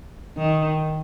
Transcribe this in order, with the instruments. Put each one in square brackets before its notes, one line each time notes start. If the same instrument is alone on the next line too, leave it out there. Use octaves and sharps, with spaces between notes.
[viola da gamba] D#3